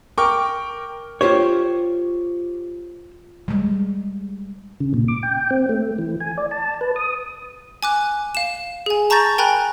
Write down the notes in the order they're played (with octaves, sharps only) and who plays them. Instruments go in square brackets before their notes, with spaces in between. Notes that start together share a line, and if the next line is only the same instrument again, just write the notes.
[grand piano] A#4 G5 C#6 D6
[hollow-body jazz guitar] F4 G4 C5 C#5
[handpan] G3 G#3
[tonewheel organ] C#3
A#2
D6
G5
C4
A3
E3
G#5
D5
A5
B4
D#6
[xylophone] G#5 D6 F#6
F5 E7
G#4 G#5
A5 A#5 C#6 G6 A6 A#6
A#4 G5 G#5 A#5 B5 F#6